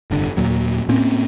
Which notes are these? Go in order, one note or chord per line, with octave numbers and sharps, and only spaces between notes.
F1 G2 D3
D#2 A#2 F#3
A2 A#3 C4 C#4